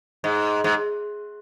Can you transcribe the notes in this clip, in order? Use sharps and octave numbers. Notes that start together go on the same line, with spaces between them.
G#2
G#2